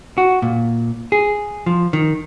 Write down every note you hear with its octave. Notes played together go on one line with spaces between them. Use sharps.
F#4
A#2
G#4
F3
D#3